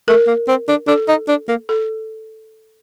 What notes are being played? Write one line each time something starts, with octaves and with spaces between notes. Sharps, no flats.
A3 A#4
A#3
C4
D4
D4 A4
D#4
D4
A#3
A4